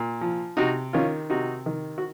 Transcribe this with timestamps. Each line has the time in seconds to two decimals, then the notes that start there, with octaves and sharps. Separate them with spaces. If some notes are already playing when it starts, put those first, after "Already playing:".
Already playing: A#2
0.21 F3
0.57 C3 D#4 F#4
0.93 D#3 C#4 F4
1.30 C3 D#4 F#4
1.66 D#3
1.98 F#4